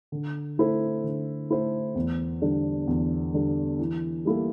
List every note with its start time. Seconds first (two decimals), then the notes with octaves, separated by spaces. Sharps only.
0.12 D3
0.58 A3 E4 A4 C5
1.04 D3
1.50 A3 E4 A4 C5
1.95 E2
2.42 D3 G3 D4 A4
2.87 E2
3.33 D3 G3 D4 A4
3.79 E3
4.25 G3 A#3 E4 A4